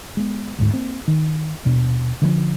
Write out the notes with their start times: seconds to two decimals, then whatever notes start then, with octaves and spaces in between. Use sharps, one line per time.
0.17 G#3 B3
0.59 D2 G#2
0.74 A#3 C4
1.08 D#3
1.65 D#1 B2 D4
2.22 D3 F3 G3 C#4